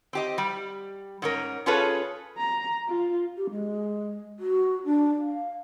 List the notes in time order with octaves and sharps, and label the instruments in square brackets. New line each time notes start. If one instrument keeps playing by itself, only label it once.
[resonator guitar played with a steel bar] C4 G4 D#5
G3
G#2 C#4 A#4
C#4 F4 G#4 A4 B4 C#5
[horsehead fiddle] A#5
F4
[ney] G4
G#3
F#4
D4
F5